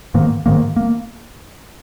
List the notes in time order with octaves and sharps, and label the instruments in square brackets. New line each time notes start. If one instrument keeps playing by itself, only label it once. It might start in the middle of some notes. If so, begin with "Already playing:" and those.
[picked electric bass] G#2 D#3 A#3
G#2 D#3 A#3
A#3